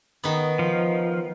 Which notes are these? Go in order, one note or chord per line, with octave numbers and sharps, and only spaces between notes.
D#3 B3
F3